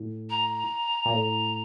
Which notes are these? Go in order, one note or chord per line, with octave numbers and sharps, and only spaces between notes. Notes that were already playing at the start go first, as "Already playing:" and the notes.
Already playing: A2
A#5
A#2
A2